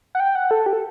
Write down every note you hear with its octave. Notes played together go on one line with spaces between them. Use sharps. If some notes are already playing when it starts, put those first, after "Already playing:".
F#5
G5
F#5
A4
G4
A4